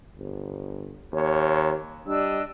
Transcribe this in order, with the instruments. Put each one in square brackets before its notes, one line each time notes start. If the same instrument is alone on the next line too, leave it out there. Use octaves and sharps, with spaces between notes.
[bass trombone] G1
[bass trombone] D#2 [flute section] C#5
[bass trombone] G3 [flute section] D4 D#5 E6